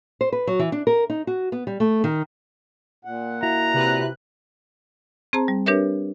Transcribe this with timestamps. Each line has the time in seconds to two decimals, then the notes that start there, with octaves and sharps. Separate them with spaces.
0.21 C5
0.32 B4
0.47 F#3
0.59 E3
0.72 D4
0.87 A#4
1.10 D#4
1.27 F#4
1.52 B3
1.67 G3
1.80 A3
2.04 D#3
3.05 A#2 F#5
3.43 E4 F#4 A#5
3.74 C3 B4 F#6
5.33 C4 G#4 C5 A5 A#5
5.48 G3
5.66 D4 G4 A#4 B4 C#5 E5